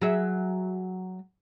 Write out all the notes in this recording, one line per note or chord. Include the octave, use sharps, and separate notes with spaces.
F#3 G#4 E5